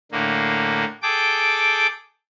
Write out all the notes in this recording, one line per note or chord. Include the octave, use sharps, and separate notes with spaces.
A2 D3 A#3
G#4 A4 G5 D6